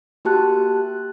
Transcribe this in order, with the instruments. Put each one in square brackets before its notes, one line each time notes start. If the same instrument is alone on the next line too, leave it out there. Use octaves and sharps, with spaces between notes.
[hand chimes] A#3 F#4 G4 A5 F#6